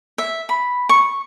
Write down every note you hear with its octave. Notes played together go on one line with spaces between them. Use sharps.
E5
B5
C#6